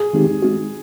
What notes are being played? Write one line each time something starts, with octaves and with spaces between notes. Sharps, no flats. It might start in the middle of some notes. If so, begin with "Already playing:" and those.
Already playing: G#4
D#3 G#3 C4 D#4 G4
G#3 C4 D#4 F#4